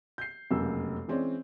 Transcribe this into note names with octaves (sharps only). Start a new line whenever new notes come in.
G6 C7
F1 F#2 C#3 A#3 E6
E3 G#3 C4 C#4 D5